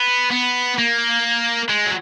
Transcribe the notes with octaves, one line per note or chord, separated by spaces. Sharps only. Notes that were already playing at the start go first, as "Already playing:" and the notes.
Already playing: B3
B3
A#3
G#3
F#3